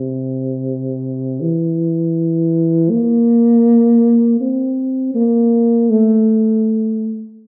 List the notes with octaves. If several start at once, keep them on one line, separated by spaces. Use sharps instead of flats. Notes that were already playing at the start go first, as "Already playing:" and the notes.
Already playing: C3
E3
A#3
C4
A#3
A3